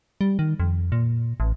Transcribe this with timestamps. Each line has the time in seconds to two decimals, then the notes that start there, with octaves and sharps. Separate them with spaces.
0.21 G3
0.39 D#3
0.60 F2
0.92 A#2
1.40 A1